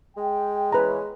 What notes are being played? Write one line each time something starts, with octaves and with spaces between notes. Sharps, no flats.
G#3 G5
E3 C#4 B4 A#5